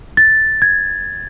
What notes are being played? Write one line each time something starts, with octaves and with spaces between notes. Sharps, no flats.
A6
G#6